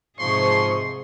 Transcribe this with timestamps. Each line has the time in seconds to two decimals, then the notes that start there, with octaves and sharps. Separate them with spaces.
0.19 G#2 C3 F3 G#4 C6 C#6